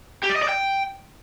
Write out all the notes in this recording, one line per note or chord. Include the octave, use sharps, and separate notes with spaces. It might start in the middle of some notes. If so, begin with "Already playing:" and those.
G4
D5
D#5
D5
G5